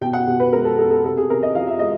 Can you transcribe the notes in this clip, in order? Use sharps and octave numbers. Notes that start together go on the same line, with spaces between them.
B2 G5
F#5
B2
B4
G#3 A#4
A4
B3 A4
A4
C3 A4
G#4
C3 A#4
D#5
F3 F5
E5
G#3 D#5